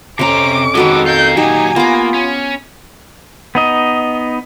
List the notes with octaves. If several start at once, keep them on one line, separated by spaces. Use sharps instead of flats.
F2 C3 C#4 C5 A#5 D6
D#3 G#3 F#4 A4 B4
F4 A#4 G6
A#2 F#3 D#4 G4 G#5
A#3 B3 F4 D6
C#4
B3 D#4 D#5